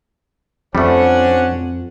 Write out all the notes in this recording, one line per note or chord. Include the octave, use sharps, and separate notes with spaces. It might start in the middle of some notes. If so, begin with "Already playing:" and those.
F2 G3 A3 C#4 D4 C5 F#5